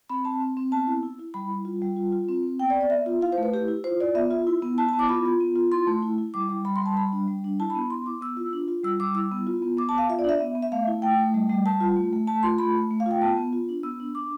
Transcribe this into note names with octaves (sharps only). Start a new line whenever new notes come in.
C4 B5
C4 A5
C4
C4
B3 A5
E4
E4
E4
G3 B5
G3
F4
G3
F4
F4
C4
C4
B3 G5
D5
B3
D5
B3 E5
F4
E4 F5
C5
A3
B4
E4 G4
E4
F4 C5
F4 D5
B3 E5
F4
E4
B3
E4 A5
A5
B3
D6
F4 B5
F4
B3
F4
E4 C6
A3
E4
E4
G3 D6
G3
G3 B5
C6
G3 A5
G3 B5
D4
G3
D4
E4 A5
B5
B3
B3 C6
E4 D6
B3 E6
F4
D4
F4
G3 E6
G3 D6
E4 E6
B3
F4
B3
B3 D6
A5
B3
F5
F4 E5
D5
D4 E5
B3
B3
E5
A3 F5
E4
A3 G5
A3
G3
G3
G3 A5
F4
A3
A3
A3 A5
F4 C6
A3 B5
A3
A3
F5
F4
G5
B3 A5
B3
F4
D4
B3 E6
D4
D4 D6